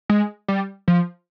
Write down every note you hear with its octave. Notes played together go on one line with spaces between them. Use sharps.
G#3
G3
F3